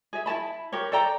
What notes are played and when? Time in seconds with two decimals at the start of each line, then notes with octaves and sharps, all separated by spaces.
0.13 G#4 E5
0.26 E4 G5 A5 B5
0.72 G4 A#4 C#5
0.92 A4 D5 G5 A#5